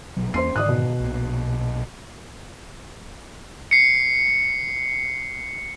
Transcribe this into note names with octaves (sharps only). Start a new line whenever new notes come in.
A#1 B2 F#3
E2 A#3 C#4 C5 C6 C7
G#2 D3 D#3 D5 D#6 F#6
B2
B1 A#2
C7 C#7